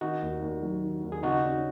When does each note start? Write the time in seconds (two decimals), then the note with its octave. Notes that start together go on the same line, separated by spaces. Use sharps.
0.01 D#3 D#4 F#4
0.22 D#2
0.42 D#2
0.62 F#3
0.82 D#3
1.03 D#2
1.12 G#4
1.23 C#3 D#4 F#4
1.44 C#4